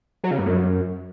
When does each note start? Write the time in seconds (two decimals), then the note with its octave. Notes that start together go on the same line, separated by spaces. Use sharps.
0.24 F#3
0.31 C#3
0.39 G2
0.46 F#2